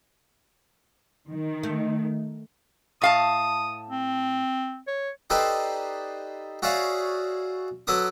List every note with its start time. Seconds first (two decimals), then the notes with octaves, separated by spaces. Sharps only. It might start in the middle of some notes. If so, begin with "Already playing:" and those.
1.29 D#3
1.63 A3
3.02 A2 F5 A5 D#6
3.90 C4
4.87 C#5
5.30 D#4 G4 A4 B4 C5 D5
6.62 F#4 G#4 C#5 D5 E5 F5
7.87 F#3 A4 B4 D6 D#6